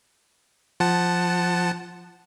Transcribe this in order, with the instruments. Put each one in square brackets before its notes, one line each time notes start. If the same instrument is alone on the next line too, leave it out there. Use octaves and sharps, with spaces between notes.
[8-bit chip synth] F3 F#5 A5